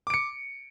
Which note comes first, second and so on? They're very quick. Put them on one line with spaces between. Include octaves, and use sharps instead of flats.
D6 D7 C#7